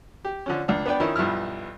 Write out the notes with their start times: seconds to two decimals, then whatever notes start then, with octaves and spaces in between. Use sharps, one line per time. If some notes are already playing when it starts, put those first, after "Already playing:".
0.25 G4
0.46 D3 F3 C#4
0.68 C#2 D4
0.86 B3 D4 B4 D5 G5
1.00 D#3 F3 C#4 D#4 E4
1.16 B1 G2 F3 E4 F6